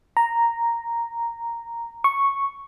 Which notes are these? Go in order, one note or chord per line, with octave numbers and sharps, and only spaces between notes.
A#5
C#6